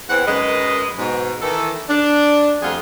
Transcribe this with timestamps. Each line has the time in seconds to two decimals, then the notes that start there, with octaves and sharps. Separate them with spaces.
0.09 E2 E3 C4 F#5
0.27 F#2 D#3 G#3 B4 D#5
0.99 G#2 B2
1.42 D#3 E3 A4
1.90 D4
2.62 F2 G3 A3 F4 G#4 F#5